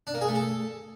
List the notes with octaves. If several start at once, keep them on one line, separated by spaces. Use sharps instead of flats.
D4
A#3
G#4
A3
A4